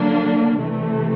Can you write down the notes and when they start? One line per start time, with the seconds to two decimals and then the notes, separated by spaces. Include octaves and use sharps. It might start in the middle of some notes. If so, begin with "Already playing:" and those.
Already playing: D3 F#3 A#3 D4
0.58 C3 E3 A3